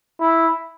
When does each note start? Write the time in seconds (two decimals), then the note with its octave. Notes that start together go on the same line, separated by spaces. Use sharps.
0.21 E4